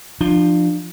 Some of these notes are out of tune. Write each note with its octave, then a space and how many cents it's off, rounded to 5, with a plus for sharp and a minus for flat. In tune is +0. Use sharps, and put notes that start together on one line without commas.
F3 +0 D4 +35